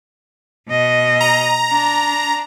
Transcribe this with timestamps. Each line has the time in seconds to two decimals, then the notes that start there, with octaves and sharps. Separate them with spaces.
0.68 B2 D#5
1.21 A#5
1.71 D4